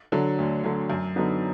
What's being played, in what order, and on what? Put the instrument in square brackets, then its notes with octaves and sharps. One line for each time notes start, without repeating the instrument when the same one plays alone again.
[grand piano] D3 F#3
D2
D3 F#3
F#2
D3 F#3 B3 D#4